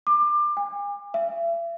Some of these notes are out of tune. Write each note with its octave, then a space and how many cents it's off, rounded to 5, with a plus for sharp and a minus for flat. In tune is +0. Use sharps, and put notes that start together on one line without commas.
D6 +25
G#5 -40
E5 +40